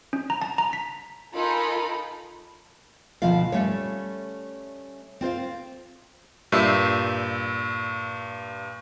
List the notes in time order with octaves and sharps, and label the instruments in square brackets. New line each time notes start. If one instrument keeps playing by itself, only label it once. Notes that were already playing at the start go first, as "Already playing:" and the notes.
[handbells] C#4
A#5
A5
A#5
B6
[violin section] D#4 F4 A4 A#4 G#5 B5
[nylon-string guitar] D2 B2 F3 C4 F4 F5
G3 A3 C#4 C#5
C4 F4 C5 F5
[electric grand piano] G2 A#2 E5 C7